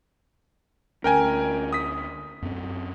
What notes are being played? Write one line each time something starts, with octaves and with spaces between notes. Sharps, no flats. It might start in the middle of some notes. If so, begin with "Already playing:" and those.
D2 C#4 A#4 G5 G#5
D#6 B6
F#2 C4